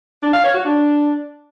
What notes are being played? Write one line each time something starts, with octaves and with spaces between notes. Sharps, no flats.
D4
F5
C#5
F#4
D4